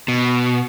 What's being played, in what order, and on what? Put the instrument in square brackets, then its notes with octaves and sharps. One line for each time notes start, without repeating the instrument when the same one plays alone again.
[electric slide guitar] B2